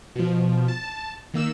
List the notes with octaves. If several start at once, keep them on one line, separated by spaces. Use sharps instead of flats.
B2 F3
A5
D#3 A#3 E6 E7